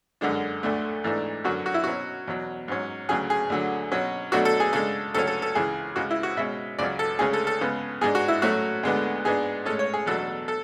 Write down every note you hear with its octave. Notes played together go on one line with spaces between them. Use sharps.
F#2 D3 G#3 D4
D2 D3 A3
G#2 E3 A3 D4
F#2 D3 F#3 C#4 F#4
F#4
E4
B2 F#3 C#4 F#4
E2 B2 F#3
G#2 F#3 C#4
D2 C#3 F#3 G#4
G#4
D2 D3 F#3
B2 F#3 C#4
B2 F#3 A3 D4 F#4
A4
G#4
C#3 G#3 D4 A4
D2 C#3 F#3 C#4 A4
A4
A4
C#2 C#3 E3 G#4
C#2 C#3 G#3 F#4
E4
F#4
B2 G#3 C#4 E5
C#2 C#3 F#3 C#4 D5
A4
D2 C#3 G#3 C#4 G#4
A4
A4
C#3 G#3 B3
G#2 G#3 D4 G#4
F#4
E4
A2 F#3 A3 C#4 F#4
D2 D3 G#3 B3 D4
G#2 G#3 B3 D4 G#4
A2 G#3 C#4 A4
C#5
G#4
E2 B2 F#3 A3 D4 A4
A4